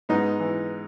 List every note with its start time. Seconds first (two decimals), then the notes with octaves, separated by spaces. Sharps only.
0.09 G#2 B3 D#4
0.40 E3